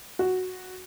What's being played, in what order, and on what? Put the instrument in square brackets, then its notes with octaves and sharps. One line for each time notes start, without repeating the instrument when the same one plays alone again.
[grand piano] F#4